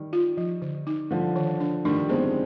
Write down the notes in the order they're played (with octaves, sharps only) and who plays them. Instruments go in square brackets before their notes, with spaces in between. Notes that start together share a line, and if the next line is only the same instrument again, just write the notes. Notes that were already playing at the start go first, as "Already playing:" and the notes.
Already playing: [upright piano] D#3 G3
[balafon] F4
F3
D3
D#4
[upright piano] D3 F3 [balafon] G3
[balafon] D#3
D4
[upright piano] D#3 G3 [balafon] D4
[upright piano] G#3 C4 [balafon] B3